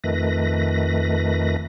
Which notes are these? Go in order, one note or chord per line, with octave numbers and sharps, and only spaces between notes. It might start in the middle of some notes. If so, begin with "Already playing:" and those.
F2 D#3 A3 B4 A#6